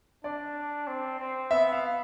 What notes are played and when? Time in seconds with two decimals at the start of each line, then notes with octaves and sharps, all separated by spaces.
0.24 D4 D5
0.87 C4
1.19 C4
1.51 B3 E5
1.73 F5